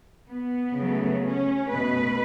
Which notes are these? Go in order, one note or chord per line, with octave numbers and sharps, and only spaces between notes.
B3
C#3 F#3 A3
C#4
B2 A3 B4